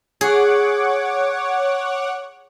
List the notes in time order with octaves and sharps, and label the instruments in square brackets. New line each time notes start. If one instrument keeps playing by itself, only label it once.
[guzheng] G#4 [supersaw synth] C#5 F#5 D6